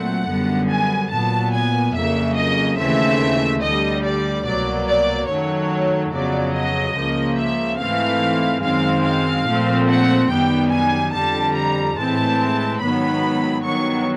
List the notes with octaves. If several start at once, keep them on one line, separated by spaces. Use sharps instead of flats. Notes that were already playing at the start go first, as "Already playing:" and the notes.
Already playing: A#2 F#3 A3 C4 F#5
F#2 D3 G3 B3
G#5
A#2 F#3 B3 A5
G#5
F2 C#3 F#3 A#3 E5
D#5
D#2 C#3 E3 A3 C4 E5
D2 D3 G3 D#5
D5
C2 B2 F#3 A#3 D5
D5
F#2 D#3 F#3 A3 C#5
F2 C#3 F#3 B3 D5
D#5
C#2 C#3 F3 A#3
E5
G#2 E3 A3 C4 F5
F#2 D#3 G#3 C4 F5
F5
A#2 F3 A3 C4
F#5
F#2 D#3 G3 B3 G5
G#5
F2 D3 G3 A5
A#5
A2 E3 G#3 C4 A5
G#2 D#3 F#3 B3 B5
G2 D#3 F#3 B3 C#6